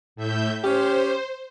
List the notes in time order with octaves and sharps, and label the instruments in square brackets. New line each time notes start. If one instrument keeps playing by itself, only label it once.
[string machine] A2 E5 G6
[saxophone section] C#4 G4 [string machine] C5